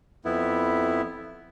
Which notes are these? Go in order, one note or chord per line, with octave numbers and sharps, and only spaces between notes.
F2 B3 E4